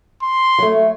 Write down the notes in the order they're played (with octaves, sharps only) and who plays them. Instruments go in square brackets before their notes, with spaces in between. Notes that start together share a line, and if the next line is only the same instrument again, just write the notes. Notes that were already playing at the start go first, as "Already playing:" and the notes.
[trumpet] C6
[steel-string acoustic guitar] F#3 A3